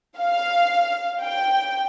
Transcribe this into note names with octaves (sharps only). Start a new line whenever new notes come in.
F5
G5